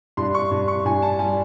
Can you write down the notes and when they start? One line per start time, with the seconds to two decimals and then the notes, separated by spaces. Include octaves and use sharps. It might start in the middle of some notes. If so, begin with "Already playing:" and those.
0.17 G2 C6
0.34 C#6
0.51 G2
0.68 C#6
0.85 G2 G#5
1.02 A5
1.19 G3 G#5